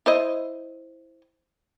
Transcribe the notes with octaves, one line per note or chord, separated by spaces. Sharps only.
E4 C5 D#5